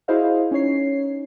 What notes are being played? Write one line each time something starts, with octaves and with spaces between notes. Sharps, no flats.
E4 F#4 G#4 C5 D#5 F5
C#4 D#4 C#5 C7